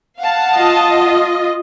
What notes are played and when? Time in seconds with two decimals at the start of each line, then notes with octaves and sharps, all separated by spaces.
0.19 F5 F#5 A5
0.57 F4 D#5